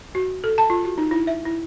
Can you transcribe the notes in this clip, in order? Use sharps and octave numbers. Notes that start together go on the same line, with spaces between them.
F#4
A4
A5
F4
F#4
D#4
E4
E5
E4